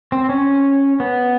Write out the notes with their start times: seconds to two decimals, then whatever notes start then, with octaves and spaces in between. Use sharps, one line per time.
0.12 C4
0.29 C#4
1.00 B3